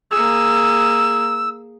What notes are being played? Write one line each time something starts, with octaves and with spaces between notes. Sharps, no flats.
A#3 G#4 E6